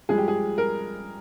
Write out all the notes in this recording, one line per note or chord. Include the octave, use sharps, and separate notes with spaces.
G2 F3 G#3 G#4
G4
G#4
A#4